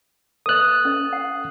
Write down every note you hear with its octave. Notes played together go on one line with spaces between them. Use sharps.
A4 B4 D#5 D#6 F#6
C#4 A4 D#5
F#5